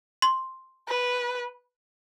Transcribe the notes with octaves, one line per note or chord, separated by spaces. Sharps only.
C6
B4